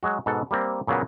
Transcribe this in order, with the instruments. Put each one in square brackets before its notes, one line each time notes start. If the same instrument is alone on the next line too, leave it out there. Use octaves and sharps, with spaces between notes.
[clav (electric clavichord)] F#3 G#3 F#4
G#2 B2 A4 F#5
G3 A#3 C4
A#2 C#3 F#3 A#3 B3